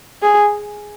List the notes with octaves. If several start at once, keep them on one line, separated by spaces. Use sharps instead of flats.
G#4